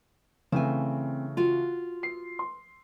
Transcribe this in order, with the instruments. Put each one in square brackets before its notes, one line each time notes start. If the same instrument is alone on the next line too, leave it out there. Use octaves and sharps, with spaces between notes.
[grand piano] C#3 E3 A3 [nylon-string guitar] C4 G#5
[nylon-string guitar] F4 F#4
[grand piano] C7
C6